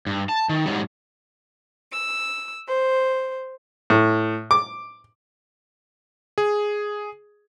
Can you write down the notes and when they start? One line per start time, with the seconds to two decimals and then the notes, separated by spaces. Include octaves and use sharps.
0.07 G2
0.29 A5
0.49 D#3
0.66 G#2 C3 F#3 G3
1.93 E6
2.68 C5
3.90 A2
4.51 D6
6.38 G#4